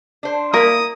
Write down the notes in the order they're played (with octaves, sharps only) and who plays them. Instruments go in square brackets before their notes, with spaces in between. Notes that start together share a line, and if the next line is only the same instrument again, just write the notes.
[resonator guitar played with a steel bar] D4 C5
[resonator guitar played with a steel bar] A#3 E4 [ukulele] A#4 [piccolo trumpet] D#6